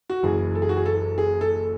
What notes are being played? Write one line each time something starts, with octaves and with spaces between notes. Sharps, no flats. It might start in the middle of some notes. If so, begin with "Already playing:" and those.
F#4
F#1 F#2 E3 G#4
A4
G#4
F#4
G#4
A4
G#4
A4